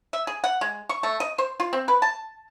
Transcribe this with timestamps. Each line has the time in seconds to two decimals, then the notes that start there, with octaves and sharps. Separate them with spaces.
0.13 E5
0.27 G#4
0.44 F#5
0.61 G#3
0.89 C#6
1.03 A3
1.20 D#5
1.38 C5
1.60 F4
1.73 C4
1.88 B4
2.02 A5